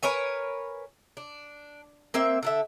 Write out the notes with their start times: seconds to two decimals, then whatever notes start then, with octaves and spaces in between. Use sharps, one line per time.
0.03 A#4 B4 C#5 G#5
1.17 D4
2.14 A#3 C4 E5
2.43 D3 A4 E5